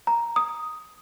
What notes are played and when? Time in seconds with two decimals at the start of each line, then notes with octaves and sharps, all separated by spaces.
0.07 A#5
0.36 D#6